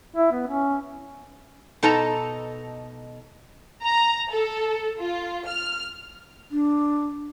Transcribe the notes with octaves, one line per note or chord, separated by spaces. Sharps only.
E4
B3
C#4
B2 D#4 A4 A5 A#5
A#5
A4
F4
F6
D4